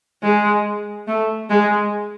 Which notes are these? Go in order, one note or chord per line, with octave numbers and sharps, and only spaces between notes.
G#3
A3
G#3